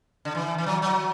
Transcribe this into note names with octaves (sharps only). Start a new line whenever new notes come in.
D3
E3
E3
F#3
F#3